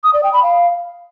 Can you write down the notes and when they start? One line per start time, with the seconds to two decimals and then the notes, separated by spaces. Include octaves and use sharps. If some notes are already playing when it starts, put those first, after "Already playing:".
0.04 D#6
0.14 D5
0.23 G5
0.33 B5
0.43 F5